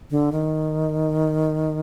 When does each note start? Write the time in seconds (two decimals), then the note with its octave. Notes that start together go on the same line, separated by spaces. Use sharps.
0.10 D3
0.32 D#3